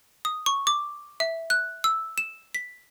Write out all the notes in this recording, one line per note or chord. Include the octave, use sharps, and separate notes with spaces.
D#6
C#6
D6
E5
F#6
E6
E7
B6